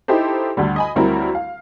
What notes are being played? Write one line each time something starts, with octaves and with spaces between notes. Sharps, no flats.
D#4 E4 G4 A4 C5
D2 D3 G3
D#5 G#5 B5
D2 F#3 G3 C4 E4 A#4
F5